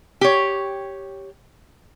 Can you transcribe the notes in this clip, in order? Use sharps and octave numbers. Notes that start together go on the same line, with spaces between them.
G4 C#5